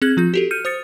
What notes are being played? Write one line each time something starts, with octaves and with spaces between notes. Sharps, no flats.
C4 G#4 F#6 G#6 F#7
F3 F4 G6
F#4 G4 A4
F6 G6 C#7 D#7
C5 D#6 A6 C#7